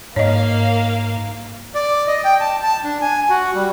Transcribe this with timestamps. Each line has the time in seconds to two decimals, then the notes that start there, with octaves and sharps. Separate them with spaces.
0.16 G#2 A#3 C#5 D#5 F5
1.75 D5
2.07 D#5
2.25 G5
2.40 A5
2.63 A5
2.84 D4
3.01 G#5
3.30 F#4
3.55 G3